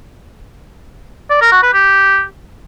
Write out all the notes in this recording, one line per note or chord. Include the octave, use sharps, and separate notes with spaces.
D5
A#4
F#4
B4
G4